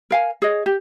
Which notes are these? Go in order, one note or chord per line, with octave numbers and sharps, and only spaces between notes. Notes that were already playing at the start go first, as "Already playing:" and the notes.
A#4 F5 G#5
G#4 C#5 D#5
G4